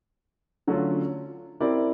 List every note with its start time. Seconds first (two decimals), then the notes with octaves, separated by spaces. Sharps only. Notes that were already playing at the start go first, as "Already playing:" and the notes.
0.67 D3 F#3 A3 C#4 F4
1.60 C4 E4 G4 A#4 D5